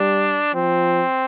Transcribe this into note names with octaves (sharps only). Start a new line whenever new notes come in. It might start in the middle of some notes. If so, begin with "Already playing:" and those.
Already playing: G3 D4
F3 C4